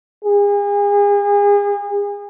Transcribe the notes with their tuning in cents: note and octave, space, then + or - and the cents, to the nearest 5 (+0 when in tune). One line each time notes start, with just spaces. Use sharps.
G#4 -35